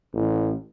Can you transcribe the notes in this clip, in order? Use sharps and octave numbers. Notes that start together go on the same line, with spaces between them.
A1